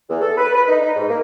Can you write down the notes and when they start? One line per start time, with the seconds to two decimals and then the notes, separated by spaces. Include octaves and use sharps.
0.08 E2
0.21 A4
0.37 B4
0.52 B4
0.68 D#4
0.82 D#4
0.96 G#2
1.09 A#3